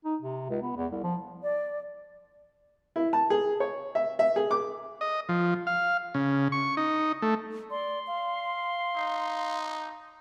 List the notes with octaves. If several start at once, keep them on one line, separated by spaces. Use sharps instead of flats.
D#4
C3
C#2
B3
E2
C2
F3
D5
E4
A5
G#4
C#5
E5
E5
G#4
D6
D#5
F3
F5
C#3
C#6
D#4
A3
D5 C6
F5
D#4